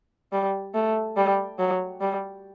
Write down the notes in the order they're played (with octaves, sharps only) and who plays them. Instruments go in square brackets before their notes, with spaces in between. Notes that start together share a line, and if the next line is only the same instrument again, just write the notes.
[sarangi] G3
A3
G3
F#3
G3